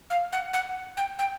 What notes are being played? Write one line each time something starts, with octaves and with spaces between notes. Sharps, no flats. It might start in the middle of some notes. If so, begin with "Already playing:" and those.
F5
F#5
F#5
G5
G5